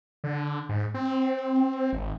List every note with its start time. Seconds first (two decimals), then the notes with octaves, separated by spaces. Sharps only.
0.24 D3
0.69 G#2
0.94 C4
1.93 G#1